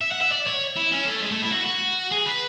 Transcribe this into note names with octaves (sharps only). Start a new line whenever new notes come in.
E5
F#5
E5
D5
C#5
E4
C#4
A3
G#3
A3
E4
F#4
F#4
G#4
B4